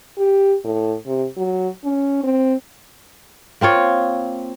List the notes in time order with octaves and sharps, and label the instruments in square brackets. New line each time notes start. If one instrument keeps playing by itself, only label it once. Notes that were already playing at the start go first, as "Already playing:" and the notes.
[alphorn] G4
A2
C3
F#3
C#4
C4
[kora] A#3 C4 F4 C#5